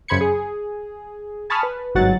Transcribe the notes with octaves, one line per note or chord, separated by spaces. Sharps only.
F#2 C#3 C5 B5 G#6 C#7
G#4
G#5 A5 B5 C#6 D#6 F6
B4
G1 G#2 F#3 F#5 A6